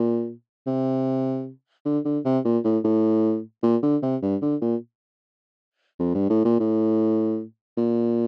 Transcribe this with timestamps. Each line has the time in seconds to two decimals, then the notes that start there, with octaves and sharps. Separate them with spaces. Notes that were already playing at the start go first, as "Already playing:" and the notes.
Already playing: A#2
0.67 C3
1.85 D3
2.05 D3
2.25 C3
2.45 A#2
2.64 A2
2.84 A2
3.63 A#2
3.83 D3
4.03 C3
4.22 G2
4.42 D3
4.62 A#2
6.00 F2
6.15 G2
6.30 A2
6.45 A#2
6.60 A2
7.77 A#2